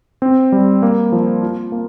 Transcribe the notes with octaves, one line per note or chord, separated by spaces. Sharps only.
C4
G3
A#3
F3
F4
A#3